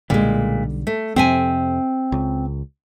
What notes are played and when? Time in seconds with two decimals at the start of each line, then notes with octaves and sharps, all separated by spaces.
0.10 B1 A#2 D3 G3 G#3
0.87 A3
1.16 F2 C3 C4 E5 G#5
2.12 C#2